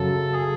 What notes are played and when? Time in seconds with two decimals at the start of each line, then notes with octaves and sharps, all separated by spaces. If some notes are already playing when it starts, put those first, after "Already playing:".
Already playing: F#2 C#3 F#3 A4
0.33 G#4